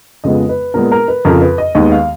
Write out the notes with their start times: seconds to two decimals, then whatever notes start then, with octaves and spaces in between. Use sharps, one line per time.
0.24 F2 C#3 F3 G#3 B3 D#5
0.49 B4
0.74 A#2 G#3 B3 A#4
0.92 A#4
1.08 B4
1.25 F2 C#3 F3 A#4
1.41 B4
1.58 D#5
1.75 D#2 D#3 G#3 B3 D#5
1.92 F5